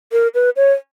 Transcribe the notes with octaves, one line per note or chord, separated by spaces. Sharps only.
A#4
B4
C#5